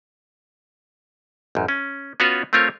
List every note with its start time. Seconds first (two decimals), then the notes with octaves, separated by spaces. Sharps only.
1.55 A1 F#2
1.68 C#4
2.20 B3 C#4 F4 F#4 B4 C#5
2.53 A3 C4 F4 A#4 C#5